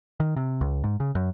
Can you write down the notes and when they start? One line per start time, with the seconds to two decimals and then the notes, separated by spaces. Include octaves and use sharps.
0.20 D#3
0.36 C3
0.61 C#2
0.84 G#2
1.00 C#3
1.15 F#2